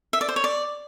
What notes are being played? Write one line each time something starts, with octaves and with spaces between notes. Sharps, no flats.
E5
D5
C5
C#5
D5